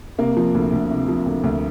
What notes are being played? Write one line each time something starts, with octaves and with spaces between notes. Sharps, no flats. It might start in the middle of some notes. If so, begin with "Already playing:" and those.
C3 A#3
F3
D2
D2
C3
F3
D2
D2